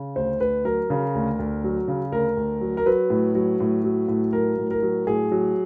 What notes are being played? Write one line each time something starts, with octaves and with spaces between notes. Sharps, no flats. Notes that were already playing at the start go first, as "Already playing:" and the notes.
Already playing: C#3
D2 C5
D2 B4
F#3 A#4
C#3
D2
D2
F#3
C#3
D2 A#4
D2
F#3
A#4
F#3 B4
A2
F#3
A2
F#3
A2
F#3 A#4
A2
A#4
F#3
A2 G#4
F#3